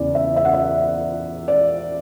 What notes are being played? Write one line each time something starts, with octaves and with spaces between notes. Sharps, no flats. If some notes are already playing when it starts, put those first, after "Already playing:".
Already playing: E2 C#3 E3 D5
E5
E5
F#5
E5
D5